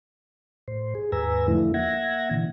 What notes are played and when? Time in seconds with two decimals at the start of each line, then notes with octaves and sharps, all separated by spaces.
0.68 A2 C5
0.95 G#4
1.12 D#2 G#2 B4 G#5 A#5 E6
1.48 E2 D3 F3 A3 E4
1.74 A#3 E5 F#5 G#6 A#6
2.31 A#2 D3 E3